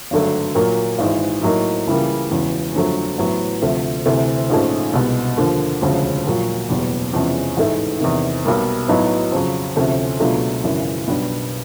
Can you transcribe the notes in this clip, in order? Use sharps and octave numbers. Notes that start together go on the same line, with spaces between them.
G#1 G2 D3 F#3 A3
A#2 F#3 A#3
G#1 G#2 E3
A2 F#3 A#3 D#4
C#2 C#3 E3 G3 A#3
E1 E2 C#3 E3
G1 F2 D3 F#3 A3
A1 A2 F#3 B3
D2 C3 F3 A3
D2 C3 E3 A3
A#1 G#2 F3 A3 C#4
C2 B2 G#3
D#2 D3 F3 A#3
E1 D2 C#3 F3
A#1 A#2 F#3
F#1 E2 B2 G3
E2 C3 F3 G#3 C#4
A1 G#2 E3 A3
E2 C3 D#3
B1 B2 G3 A#3
B1 A2 F#3 B3 D#4
F2 C#3 F#3
D2 C3 F3 A3 C#4
C#2 B2 F#3 A3 D4
G#1 F#2 C#3 E3
B1 B2 G3 B3 D4